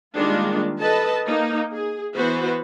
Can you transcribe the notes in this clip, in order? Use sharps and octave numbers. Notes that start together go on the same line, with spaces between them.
D#3 G3 G#3 A#3 D4 F4
A4 B4 D#5 A5
A#3 D#4
G#4
E3 B3 F#4 B4 C5